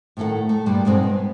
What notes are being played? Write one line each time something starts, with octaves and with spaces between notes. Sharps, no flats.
A2 D#3 A3 A4 F#5
A3
G2 A#2 G3 G#3
G2 B2 G#3 C4 D#4
B3